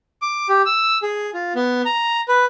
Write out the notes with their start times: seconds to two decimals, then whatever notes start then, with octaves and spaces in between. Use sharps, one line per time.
0.22 D6
0.49 G4
0.66 E6
1.03 G#4
1.34 F4
1.55 B3
1.86 A#5
2.28 B4